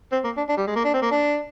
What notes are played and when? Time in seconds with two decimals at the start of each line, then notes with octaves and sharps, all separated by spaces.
0.12 C4
0.25 A#3
0.37 D4
0.49 D4
0.57 G3
0.67 G#3
0.76 A#3
0.85 D4
0.94 C4
1.02 A#3
1.11 D4